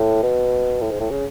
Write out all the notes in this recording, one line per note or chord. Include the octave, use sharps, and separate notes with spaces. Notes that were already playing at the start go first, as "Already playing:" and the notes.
Already playing: A2
B2
A2
G#2
A2
C#3